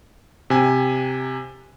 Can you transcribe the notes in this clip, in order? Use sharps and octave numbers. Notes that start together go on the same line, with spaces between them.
C3 G#5